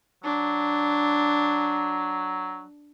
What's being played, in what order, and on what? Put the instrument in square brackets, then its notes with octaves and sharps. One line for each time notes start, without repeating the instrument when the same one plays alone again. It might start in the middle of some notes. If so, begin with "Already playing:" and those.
[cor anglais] F#3 [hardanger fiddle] D4